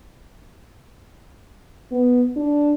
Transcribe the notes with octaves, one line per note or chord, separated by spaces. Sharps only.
B3
D4